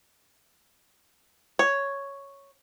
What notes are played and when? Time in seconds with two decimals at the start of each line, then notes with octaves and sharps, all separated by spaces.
1.59 C#5